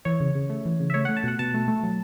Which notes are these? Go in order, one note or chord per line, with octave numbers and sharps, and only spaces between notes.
E3 C#5
C#3
C#3
A3
E3
C#3
E5
A3 C#5
A3 F#5
A5
B2 F#5
B2 A5
A3
A3
F#3